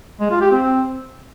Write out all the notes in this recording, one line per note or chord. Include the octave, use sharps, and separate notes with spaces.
G#3
F4
G4
C4